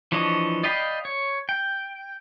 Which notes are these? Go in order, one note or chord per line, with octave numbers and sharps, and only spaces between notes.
E3 F3 D4 C#5 D#5
D5 D#5 F5 G5 B5
C#5
G5